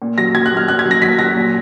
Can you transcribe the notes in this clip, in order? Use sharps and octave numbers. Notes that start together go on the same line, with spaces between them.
A#2
F#3 A#6
F#3 G#6
F#6
A#2 F6
A#2 F#6
G#6
F#3
A#6
F#3 B6
F#3 A#6
A#2